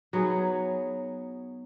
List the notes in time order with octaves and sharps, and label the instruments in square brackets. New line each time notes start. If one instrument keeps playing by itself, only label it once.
[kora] F#3 B3 D#4 G#4